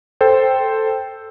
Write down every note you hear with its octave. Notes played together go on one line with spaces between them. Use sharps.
A4 C5 G5